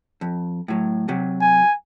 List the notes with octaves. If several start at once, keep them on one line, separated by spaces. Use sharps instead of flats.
F2
A2 F#3
C3 F#3
G#5